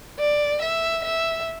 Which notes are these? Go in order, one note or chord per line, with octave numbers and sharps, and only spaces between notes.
D5
E5
E5